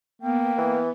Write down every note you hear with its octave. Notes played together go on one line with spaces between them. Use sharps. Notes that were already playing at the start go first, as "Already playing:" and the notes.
A#3 B3 G5
E3